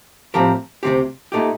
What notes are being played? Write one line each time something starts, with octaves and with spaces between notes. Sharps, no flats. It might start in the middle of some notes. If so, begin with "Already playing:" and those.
A2 F3 C4 G4 A#4
D2 C3 F3 C4 G4
A#2 A3 D#4 G4